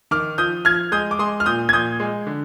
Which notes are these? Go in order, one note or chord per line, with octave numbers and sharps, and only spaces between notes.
D#3 D6 F6
F3 D#6 G6
F3 F6 G#6
G#3 D#6 G6
D6
G#3 C6 D#6
F6
A#2 D#6 G6
G#6
A#2 D#6 G6
G#3
D3